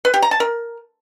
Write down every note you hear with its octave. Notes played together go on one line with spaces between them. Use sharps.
B4
G4
A#5
A5
A#4